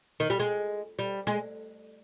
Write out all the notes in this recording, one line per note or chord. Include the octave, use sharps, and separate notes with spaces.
D#3
G3
G#3
G3
G#3